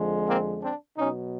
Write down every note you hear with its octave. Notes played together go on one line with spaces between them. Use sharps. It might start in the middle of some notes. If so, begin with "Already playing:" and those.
Already playing: F2 D3 F3 G#3
A#3 C4
C4 D4
B2 F#3 C#4 D#4